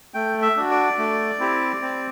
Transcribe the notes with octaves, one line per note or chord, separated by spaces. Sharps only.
A3 G5
E5
D4 F#4
D5
A3
C4 E4 G4
C4